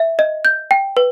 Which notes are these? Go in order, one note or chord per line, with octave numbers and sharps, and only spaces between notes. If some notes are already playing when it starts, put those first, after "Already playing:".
Already playing: E5
D#5
G6
G5
B4